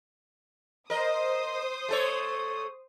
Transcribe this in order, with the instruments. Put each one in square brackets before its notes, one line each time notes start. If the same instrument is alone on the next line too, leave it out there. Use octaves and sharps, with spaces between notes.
[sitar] A#4 D#5 [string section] C5 D#6
[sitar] A3 A4 C#5